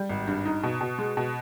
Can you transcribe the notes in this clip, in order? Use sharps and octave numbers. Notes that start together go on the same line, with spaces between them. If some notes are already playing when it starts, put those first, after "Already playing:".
Already playing: G3
G#1
G2
D#4
B2
B2
G#3
B2